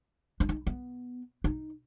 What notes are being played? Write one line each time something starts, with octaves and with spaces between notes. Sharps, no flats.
D4
D#4
B3
D#4